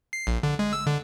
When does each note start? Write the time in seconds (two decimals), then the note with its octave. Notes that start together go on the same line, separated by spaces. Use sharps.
0.13 C7
0.27 A#1
0.43 D3
0.59 G#3
0.73 E6
0.87 D3